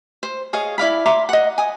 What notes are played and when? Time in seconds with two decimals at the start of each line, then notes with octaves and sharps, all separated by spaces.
0.23 C5
0.53 G#4 C#5 D#5 F5
0.78 E4 D5 F5 B5
1.06 E5 A#5 C6 D6
1.29 D#5 F#5
1.58 G#5 D#6